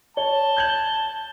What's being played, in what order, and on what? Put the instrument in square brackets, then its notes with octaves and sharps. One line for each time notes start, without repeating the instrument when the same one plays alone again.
[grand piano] C#5 [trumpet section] A5 [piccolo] G7
[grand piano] G6 G#6 F#7